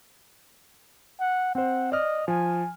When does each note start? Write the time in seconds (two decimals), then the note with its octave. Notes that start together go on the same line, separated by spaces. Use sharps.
1.20 F#5
1.55 C4 C5 F#5
1.92 D5 D#5 F6
2.28 F3 G#5